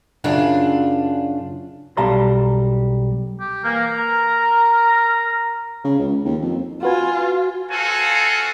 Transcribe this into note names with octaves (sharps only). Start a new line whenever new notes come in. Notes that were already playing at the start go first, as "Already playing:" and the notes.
F#2 C#3 D4 F4
B1 G3 F5 A5 A#5 C6
G4
E3 A#3 A#4
A#5
C#3
C#2
D#2
F2
F4 F#4 B4 G#5
C4 F4 F#4 A4 F5 G#5